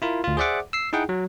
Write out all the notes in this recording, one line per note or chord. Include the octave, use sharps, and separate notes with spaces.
E4 F4 A#4
D2 F4
G#4 C5 D5 E5 F#5 D6
E6 C7
D#4 E4 G#4 F#5 G5
F#3